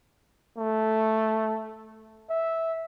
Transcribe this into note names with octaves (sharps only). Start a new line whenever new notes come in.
A3
E5